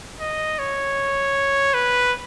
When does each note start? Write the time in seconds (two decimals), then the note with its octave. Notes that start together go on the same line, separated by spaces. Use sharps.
0.21 D#5
0.59 C#5
1.74 B4